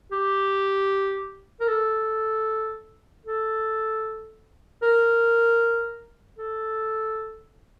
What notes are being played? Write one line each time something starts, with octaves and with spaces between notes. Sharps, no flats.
G4
A#4
A4
A4
A#4
A4